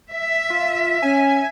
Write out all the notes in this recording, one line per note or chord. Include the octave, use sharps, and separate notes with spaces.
E5
F4
C#4 G#5